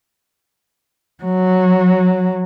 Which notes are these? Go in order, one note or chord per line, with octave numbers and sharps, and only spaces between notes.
F#3